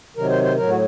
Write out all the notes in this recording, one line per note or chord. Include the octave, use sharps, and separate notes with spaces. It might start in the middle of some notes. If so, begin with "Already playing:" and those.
C3 D#3 F#3 A#4
C5
C5
A2 F#3 A#4
F#4